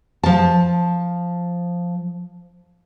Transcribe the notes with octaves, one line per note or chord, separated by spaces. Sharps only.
F3 A5